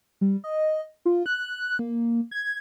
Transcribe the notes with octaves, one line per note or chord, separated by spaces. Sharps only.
G3
D#5
F4
F#6
A#3
G#6